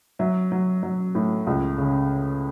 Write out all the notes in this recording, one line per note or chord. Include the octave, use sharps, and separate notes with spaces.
F#3 E5
F#3
F#3
A2
C#2
C#3